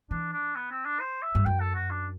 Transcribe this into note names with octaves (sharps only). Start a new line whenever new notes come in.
E3 D4
D4
B3
C4
D4
C5
E5
G2
F#2 G5
A4
F#4
D4